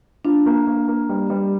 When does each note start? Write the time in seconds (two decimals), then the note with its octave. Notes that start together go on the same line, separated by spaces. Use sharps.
0.25 D4 F4
0.46 A#3
0.67 A#3
0.88 A#3
1.09 G3
1.30 G3